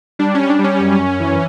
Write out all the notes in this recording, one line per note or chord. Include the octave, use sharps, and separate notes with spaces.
G3 D4
G3 C#4
D4
G3
C#4
F#2
F#2
E3